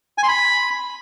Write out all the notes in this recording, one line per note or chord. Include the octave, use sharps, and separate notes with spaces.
G#5
C6
B5